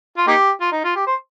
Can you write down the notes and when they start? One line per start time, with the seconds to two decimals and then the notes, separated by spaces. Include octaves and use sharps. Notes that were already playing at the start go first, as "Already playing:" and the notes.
0.17 F4
0.27 A#3 D#4 G4
0.61 F4
0.72 D#4
0.84 F4
0.95 G4
1.07 C5